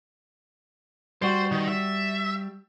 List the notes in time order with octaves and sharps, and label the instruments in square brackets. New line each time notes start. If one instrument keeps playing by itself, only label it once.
[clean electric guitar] G3 F#4 [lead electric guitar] C5
[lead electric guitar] D#3
E5